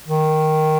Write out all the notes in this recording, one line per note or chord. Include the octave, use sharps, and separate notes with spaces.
D#3